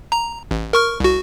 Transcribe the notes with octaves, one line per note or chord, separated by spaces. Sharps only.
A#5
A1
A#4 C#6 F6
C2 F#4